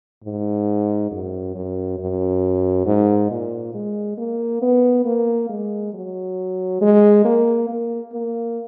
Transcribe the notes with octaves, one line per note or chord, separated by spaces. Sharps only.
G#2
F#2
F#2
F#2
G#2
A#2
G#3
A#3
B3
A#3
G#3
F#3
G#3
A#3
A#3
A#3